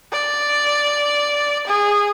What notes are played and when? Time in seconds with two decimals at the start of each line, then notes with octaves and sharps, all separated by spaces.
0.12 D5
1.67 G#4